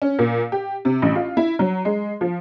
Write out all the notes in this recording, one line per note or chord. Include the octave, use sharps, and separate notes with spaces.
C#4
A#2
G4
C3
A1
F4
E4
F#3
G#3
F3